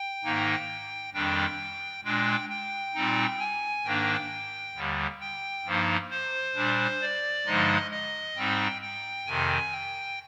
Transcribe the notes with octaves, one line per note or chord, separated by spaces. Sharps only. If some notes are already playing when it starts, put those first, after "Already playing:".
Already playing: G5
G#2 D#3 A#3 D#4
F2 D#3 G3 D4 G5
A#2 G#3 D4 G5
G5
A#2 G3 C4 D#4
G#5
G#2 D#3 A#3 D4 G5
D#2 D3 G3
G5
G2 F3 A#3 D#4
C5
A#2 G3 D4
D5
G2 D3 F3 G#3 D#4 D#5
D#5
G#2 G3 C4 D#4 G5
G5
F2 C3 D#3 G#5
G5